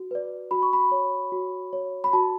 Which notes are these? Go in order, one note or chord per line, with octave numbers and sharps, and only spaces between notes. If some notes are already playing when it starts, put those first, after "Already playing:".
Already playing: F#4
B4 D5
F#4 B5
C#6
B5
C#5
F#4
C#5
B5
F#4 A5